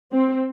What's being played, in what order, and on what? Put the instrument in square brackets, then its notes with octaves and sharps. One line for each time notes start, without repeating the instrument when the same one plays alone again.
[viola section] C4